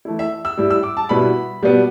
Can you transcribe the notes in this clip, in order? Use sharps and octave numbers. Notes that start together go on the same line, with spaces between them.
E3 A3 E4
E5
E6
A2 G3 E4
E6
D6
A5
B2 G3 B3 E4 B5
B2 G3 B3